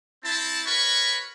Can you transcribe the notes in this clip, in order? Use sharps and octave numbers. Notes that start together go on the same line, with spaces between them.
C4 E4 A5
F#4 A#4 B4 C#5 B5 C#6